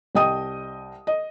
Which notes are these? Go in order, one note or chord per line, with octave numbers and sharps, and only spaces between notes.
C2 D#5 G5 D#6 D#7
D#5